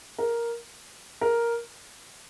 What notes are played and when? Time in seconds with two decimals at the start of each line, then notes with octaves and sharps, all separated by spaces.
0.18 A#4
1.21 A#4